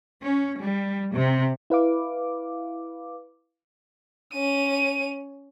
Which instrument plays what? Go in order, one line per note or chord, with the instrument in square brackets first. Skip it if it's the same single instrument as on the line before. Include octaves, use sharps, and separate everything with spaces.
[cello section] C#4
G3
C3
[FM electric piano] E4 B4 F5 D6
[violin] C#4 D#7